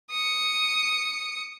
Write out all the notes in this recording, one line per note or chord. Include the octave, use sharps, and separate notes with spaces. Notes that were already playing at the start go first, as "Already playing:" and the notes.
D#6 C#7